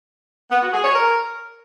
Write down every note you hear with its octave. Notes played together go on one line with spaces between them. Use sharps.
B3
F#4
G#4
C#5
A#4